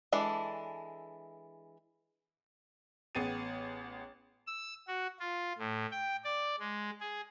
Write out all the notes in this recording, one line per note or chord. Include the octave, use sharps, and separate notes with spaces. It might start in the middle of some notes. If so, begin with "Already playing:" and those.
E3 G#3 D4 A4
A1 B3 G#4 G5 A6 D#7
E6
F#4
F4
A2
G5
D5
G#3
G#4